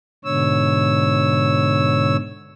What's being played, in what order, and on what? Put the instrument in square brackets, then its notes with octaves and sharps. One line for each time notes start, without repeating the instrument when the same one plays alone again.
[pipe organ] G#2 B2 D3 C#5 E6